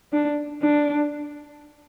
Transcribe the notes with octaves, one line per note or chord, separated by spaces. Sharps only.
D4
D4